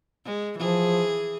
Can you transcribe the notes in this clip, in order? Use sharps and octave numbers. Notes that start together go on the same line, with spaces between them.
G#3
E3 F3 G#4